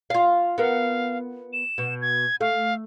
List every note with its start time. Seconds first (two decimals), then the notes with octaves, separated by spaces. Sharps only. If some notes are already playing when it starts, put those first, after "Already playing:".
0.10 F4 F5
0.58 B3 A#4 F5
1.53 E7
1.78 B2
2.01 G#6
2.41 A3 F5